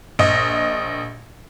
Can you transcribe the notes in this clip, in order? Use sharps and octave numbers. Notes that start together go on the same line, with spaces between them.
A#1 D#5